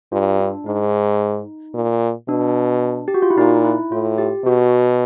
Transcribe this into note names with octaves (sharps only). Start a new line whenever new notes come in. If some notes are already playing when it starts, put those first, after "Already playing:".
G2 F4
D4
G#2 D#4
A#2
B2 D4
G4
F#4
F4
E4
A#2 D#4
E4
A2 F4
G4
B2 F#4